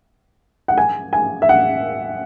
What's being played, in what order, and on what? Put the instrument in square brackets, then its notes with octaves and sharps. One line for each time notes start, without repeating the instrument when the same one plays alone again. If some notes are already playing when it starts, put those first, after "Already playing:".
[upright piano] F#5
G#5
G#5
E5
F#5